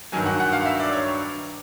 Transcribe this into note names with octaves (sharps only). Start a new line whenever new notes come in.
G2 D#3 F#3 G#5
F#5
F#5
F5
E5
D5
C#5